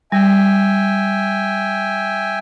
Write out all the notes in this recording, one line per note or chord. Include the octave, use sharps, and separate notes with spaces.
G3 E5 G5 G#5